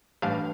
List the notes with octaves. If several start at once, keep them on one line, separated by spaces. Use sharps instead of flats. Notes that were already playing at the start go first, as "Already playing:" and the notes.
A1 G2 G3 D4 F5